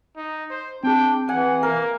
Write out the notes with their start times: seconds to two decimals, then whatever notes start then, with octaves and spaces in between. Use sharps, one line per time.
0.17 D#4
0.50 C5
0.84 C4 D4 G#4 G5
1.29 E3 F#5 G#5
1.63 A#3 A#4